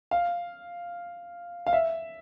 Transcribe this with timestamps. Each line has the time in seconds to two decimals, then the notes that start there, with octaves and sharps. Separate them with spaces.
0.11 F5
1.67 F5
1.73 E5